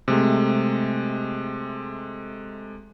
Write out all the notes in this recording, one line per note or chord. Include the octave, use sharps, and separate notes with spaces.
C3 G#3 A3